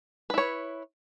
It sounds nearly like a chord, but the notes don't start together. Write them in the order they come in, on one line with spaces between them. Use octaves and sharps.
B4 E4 C#5